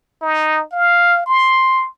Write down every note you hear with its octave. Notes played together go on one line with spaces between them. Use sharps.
D#4
F5
C6